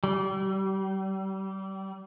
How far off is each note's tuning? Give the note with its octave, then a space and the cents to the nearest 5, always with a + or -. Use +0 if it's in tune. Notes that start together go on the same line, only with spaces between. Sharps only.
G3 -30